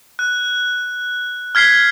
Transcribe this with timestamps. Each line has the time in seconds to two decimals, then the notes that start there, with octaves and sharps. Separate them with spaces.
0.19 F#6
1.55 F6 G#6 B6 C7 G7